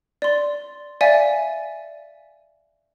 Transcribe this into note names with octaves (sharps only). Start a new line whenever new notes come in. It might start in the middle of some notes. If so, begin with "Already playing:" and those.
D5 C6
D5 E5 F5 G#5